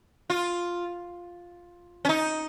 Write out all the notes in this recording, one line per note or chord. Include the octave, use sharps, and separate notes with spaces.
F4
C#4
D#4